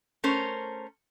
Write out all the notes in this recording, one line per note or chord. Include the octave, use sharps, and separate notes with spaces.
A3 C#4 A#4 C5